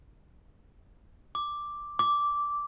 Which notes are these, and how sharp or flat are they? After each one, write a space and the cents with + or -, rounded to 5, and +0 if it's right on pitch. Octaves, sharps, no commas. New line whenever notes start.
D6 +0
D6 -10